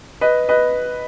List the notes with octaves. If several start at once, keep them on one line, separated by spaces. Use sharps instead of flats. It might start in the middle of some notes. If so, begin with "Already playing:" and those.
B4 D#5
B4 D#5